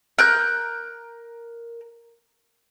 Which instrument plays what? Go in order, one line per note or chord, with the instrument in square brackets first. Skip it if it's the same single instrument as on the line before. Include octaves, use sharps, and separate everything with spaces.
[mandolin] A#4 F#6 G6